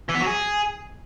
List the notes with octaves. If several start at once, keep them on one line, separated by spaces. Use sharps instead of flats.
E3
B3
F#3
G#4